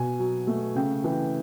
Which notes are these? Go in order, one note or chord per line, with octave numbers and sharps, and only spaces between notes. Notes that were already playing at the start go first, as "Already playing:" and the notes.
Already playing: B2 G#5
F#3
A3
C#3 G5
E3